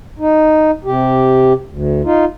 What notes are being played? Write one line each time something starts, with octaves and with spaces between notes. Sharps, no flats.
D#4
C3 G4
D2
D#4 F4